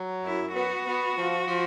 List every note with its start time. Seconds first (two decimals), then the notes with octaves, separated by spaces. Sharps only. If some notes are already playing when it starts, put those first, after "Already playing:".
Already playing: F#3
0.24 F#2 E4
0.55 B3 F#4
0.87 B3
1.17 F3
1.48 F3